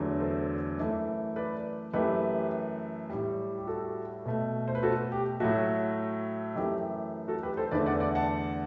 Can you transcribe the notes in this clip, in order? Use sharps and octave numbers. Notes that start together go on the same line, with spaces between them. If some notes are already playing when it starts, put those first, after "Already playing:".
Already playing: E2 D3 F#3 A3
A4 C5
F#2 E3 A3
B4 D5
F#2 E3 A3 G4 B4
A2 G3
G4
F#4 A4
B2 A3
C5
B4
F#4 A4
G4
A2 F#3 A3 F#4
F#2 E3 A3 G4
F#4 A4
G4 B4
A4 C5
E2 D3 A3 B4 D5
D5 F#5
D5 F#5
F#5 A5